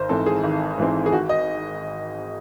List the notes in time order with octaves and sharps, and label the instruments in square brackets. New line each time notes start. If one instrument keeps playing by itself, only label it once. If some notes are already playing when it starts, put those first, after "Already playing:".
Already playing: [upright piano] G#1 C5
G#2 E3 C4 A4
G#4
G#1
G#2 E3 C4
G#4
G#1 F#4
D#5